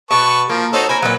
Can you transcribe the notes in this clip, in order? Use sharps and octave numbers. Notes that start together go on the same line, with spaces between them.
B2 B4 A5 C#6
F3 A#3
D#4 F#4 A4 C5 C#5
A#4 C5 G#5 B5
A#2 D#3 F#3 B4